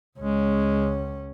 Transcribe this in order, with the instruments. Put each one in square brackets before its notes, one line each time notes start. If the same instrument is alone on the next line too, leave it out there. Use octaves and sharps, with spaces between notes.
[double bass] C#2 C#4 [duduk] G#3